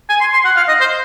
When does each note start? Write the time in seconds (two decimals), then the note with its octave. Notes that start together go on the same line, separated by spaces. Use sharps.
0.10 G#5
0.21 C6
0.33 C6
0.45 F#5
0.57 F5
0.68 D#5
0.80 C5